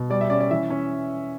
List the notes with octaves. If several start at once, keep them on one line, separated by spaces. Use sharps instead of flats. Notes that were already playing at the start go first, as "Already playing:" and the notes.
Already playing: B2
G3 D5
E5
C#4 D5
D5
E3 E5
C#4